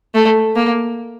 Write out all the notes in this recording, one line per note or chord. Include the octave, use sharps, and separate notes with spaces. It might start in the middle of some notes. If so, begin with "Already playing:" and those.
A3
A#3